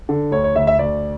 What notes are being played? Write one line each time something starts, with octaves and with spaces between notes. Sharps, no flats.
D3
D2 C#5
C#5
D2 E5
E5
D2 D5